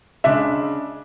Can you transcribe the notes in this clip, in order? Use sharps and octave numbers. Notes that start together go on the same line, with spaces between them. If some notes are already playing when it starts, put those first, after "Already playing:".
C#3 G#3 D4 E5